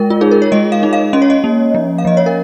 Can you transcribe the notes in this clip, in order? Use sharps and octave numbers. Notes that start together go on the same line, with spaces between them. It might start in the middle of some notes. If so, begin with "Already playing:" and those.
Already playing: G#3 A#4
F4
D#4 G#4
A#4
C#5
G#3 D#5
F5
D#4
F5
C#4 D#5
C#5
D#5
A#3
F3
F5
F3 D#5
C#5
A#4